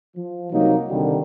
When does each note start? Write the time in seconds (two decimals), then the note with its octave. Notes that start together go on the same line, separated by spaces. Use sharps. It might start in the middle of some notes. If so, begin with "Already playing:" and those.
0.16 F3
0.51 C2 F#3 A#3 D#4
0.90 C2 D3 D#3 G3